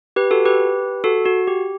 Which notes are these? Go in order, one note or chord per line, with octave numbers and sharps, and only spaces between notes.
G4 B4
F#4 A4
G4 B4
F#4 A4
F#4
G4